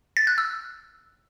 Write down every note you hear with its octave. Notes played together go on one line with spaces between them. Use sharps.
A6
F#6
E6